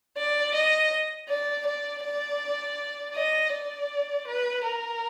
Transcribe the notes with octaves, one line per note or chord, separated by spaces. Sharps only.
D5
D#5
D5
D5
D5
D#5
D5
B4
A#4